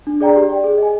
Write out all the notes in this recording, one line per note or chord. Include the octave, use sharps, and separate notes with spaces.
D4
G#4 D5 G5 A#5
G4
D5 G5
G#4
D#5 G#5